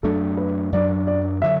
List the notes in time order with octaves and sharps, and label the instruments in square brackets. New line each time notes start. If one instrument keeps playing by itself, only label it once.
[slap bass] F#2 F#3 A3 D4 [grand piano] A4
[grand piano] B4
[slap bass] F#2 F#3 A3 D4 [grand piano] D5
[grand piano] D5
[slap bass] D3 F#3 [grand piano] E5